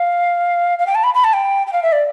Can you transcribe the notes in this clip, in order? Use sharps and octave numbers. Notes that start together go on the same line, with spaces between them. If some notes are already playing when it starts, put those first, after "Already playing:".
Already playing: F5
F5
G5
A5
B5
B5
A5
G5
G5
F5
E5
D5